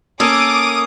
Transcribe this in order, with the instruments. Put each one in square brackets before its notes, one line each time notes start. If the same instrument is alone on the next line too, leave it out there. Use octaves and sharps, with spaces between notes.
[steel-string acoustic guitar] A#3 C#4 [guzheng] A4 [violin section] D6 [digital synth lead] D#6